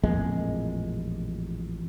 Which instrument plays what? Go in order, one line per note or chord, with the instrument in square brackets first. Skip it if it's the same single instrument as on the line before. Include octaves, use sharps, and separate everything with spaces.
[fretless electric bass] A1 F2 A#2 G#3